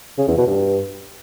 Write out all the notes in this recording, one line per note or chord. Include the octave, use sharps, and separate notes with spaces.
C#3
E2
B2
G2